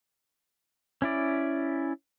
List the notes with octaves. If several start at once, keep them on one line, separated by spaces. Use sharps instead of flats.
C#4 E4 D5